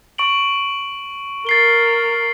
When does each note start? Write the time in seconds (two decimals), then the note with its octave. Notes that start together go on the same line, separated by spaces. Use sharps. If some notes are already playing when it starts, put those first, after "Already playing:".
0.18 C#6 D7 F#7
1.47 A#4 A6 C7 G7